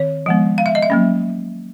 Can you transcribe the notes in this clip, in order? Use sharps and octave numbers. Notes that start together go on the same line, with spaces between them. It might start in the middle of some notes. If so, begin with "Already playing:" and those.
Already playing: D#3 C4 C#5
F3 G#3 B3
F5
E5
D#5
E5
F#3 A#3 C#4